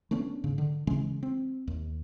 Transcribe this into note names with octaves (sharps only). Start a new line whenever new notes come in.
A3 B3 C#4 D4
G#2 C#3
D3
C#3 E3 G#3 C#4
C4
D#2